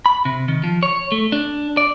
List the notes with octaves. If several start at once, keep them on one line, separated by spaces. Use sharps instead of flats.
B5
C3
D#3
F3
C#5
A3
D4
D5